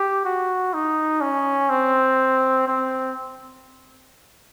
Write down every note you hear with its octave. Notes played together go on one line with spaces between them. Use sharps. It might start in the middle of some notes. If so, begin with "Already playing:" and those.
Already playing: G4
F#4
D#4
C#4
C4
C4